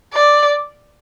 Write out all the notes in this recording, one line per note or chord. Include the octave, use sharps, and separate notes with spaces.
D5